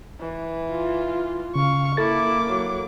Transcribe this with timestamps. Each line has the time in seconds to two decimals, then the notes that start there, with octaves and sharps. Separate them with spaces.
0.20 E3
0.71 F4
1.55 C#3 F5 C#6
1.97 A#3 E4 A4 D6 A6
2.47 F#3